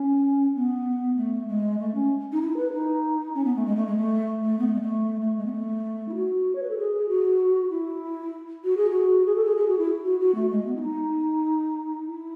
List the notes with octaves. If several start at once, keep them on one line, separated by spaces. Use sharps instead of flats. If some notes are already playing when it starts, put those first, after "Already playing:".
Already playing: C#4
B3
A3
G#3
A3
C#4
D#4
E4
B4
D#4
C#4
B3
A3
G#3
A3
G#3
A3
A3
B3
A3
G#3
A3
A3
G#3
B3
A3
E4
F#4
C#5
B4
A4
G#4
F#4
E4
F#4
G#4
F#4
G#4
A4
G#4
G#4
F#4
E4
F#4
F#4
A3
G#3
B3
E4
D#4
E4